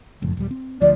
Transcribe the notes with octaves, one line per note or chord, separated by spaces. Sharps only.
F#1 F2 A2
D#1 G3
C4
D2 F3 D5